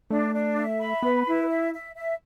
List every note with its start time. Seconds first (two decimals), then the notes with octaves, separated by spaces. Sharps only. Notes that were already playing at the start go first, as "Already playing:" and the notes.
0.10 A3 D4
0.34 D4
0.57 E5
0.80 B5
1.02 B3 B4
1.26 E4
1.49 E5
1.73 E5
1.95 E5